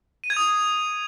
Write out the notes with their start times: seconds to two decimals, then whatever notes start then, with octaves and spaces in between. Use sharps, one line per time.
0.24 D#7
0.30 G#6
0.37 D#6